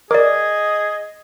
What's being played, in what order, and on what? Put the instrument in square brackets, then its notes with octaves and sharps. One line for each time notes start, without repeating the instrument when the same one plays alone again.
[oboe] G#4 [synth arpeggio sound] A#4 [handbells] D5 D6 [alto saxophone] D#5